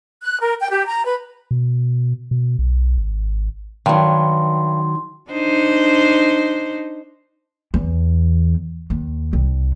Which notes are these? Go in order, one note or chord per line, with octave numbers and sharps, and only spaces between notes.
F#6
A#4
G5
G4
A#5
B4
B2
B2
B1
G#1
G2 D#3 F#3 C6
D4 D#4 C5
E2
D#2
C2